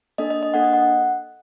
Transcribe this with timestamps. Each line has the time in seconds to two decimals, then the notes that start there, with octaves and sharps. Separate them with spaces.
0.18 A#3 D4 A4 D#5
0.30 D#5
0.43 D#5
0.54 A#3 D4 A4 F#5
0.64 D#5
0.73 F#5